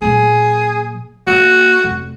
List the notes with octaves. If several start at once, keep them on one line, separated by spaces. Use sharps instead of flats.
A#2 F#3 G#4
A#3 F#4
F1